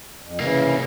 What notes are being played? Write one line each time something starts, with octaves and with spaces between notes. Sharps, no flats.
F2
C2 C#3 E3 A#3